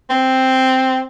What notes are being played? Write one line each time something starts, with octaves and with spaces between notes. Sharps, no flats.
C4